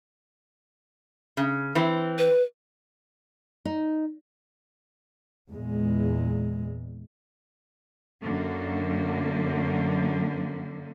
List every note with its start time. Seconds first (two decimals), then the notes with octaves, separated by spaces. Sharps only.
1.37 C#3
1.75 E3 C4
2.18 B4
3.65 D#4
5.49 E2 A#2 G#3
8.23 F#2 D3 A#3